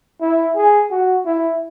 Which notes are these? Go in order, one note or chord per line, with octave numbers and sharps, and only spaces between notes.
E4
G#4
F#4
E4